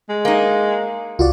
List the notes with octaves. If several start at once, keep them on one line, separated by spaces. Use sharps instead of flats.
G#3
A#3 D#4
C#2 F4 F#4 D5